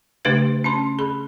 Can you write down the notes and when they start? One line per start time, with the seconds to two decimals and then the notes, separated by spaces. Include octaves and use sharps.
0.25 C#3 A3 D4 G4 B4 G#6
0.64 C#4 A5 C6
0.99 G#4 B5